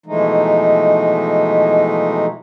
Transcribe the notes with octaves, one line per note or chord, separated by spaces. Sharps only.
B2 E3 F3 G#3 A3 D#4